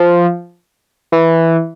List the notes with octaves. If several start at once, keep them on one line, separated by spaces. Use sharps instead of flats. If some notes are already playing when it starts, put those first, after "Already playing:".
Already playing: F3
E3